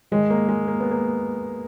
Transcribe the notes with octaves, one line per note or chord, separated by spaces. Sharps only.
G#2 D#3 G#3
A#3
G#3
A#3
B3
A#3